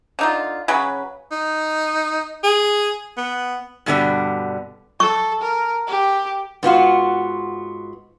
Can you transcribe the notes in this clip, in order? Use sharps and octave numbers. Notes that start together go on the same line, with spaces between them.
D3 D#4 F4
C#3 F#3 B4
D#4
G#4
B3
G2 B2 D3 G3 B3 D5
A4 C#6
A#4
G4
G#2 B3 F4 F#4